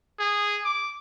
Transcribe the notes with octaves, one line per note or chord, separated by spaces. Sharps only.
G#4
D6